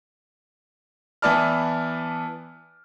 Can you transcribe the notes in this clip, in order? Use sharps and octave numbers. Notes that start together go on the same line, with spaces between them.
E3 B3 E4 D5 A5 F6